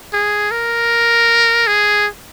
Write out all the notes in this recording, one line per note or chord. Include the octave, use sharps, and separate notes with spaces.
G#4
A#4
G#4